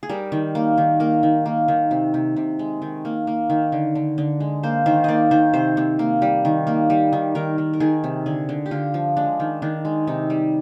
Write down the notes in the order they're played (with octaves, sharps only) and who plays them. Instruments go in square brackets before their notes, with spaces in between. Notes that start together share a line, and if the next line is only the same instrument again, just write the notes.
[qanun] G#4
G3 A#4
D#3
A#3
D#3
A#3 A#4
D#3
A#3
D#3
C3
C3
C3
G#3
D#3
A#3
A#3
D#3
D3
D3
D3
G#3
A#3 C5
D#3 C5
A#3 D5 D#5
D#3 C5
C3 C5
C3
A#3
G3
D#3
A#3
G3
D#3
D#3 A#4
D#3
A#4
D#3 G#4
C3
D3 G#4
D3
G4
D3 F4
F3
G#3 D4
D#3
D#3 D4
G#3
C3 D#4
G3